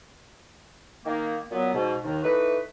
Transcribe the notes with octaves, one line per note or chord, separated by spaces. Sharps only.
D#3 A#3
A#2 F#3 B3
G#2 B2
D#2 D#3
E3 A3 D#4 B4